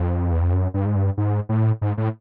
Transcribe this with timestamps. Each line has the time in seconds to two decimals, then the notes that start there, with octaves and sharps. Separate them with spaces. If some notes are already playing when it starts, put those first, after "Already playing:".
Already playing: F2
0.32 E2
0.42 F2
0.53 F#2
0.74 G2
0.86 G#2
0.95 G2
1.17 G#2
1.49 A2
1.82 G#2
1.98 A2